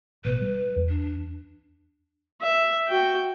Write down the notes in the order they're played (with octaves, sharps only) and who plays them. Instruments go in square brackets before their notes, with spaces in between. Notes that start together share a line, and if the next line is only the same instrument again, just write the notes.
[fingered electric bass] A1 B2 [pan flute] B4
[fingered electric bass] G3
E2
[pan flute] D4
[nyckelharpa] E5
F#4 G5